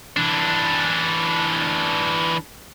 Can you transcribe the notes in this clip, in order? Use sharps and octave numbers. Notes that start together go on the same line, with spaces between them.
E3 D4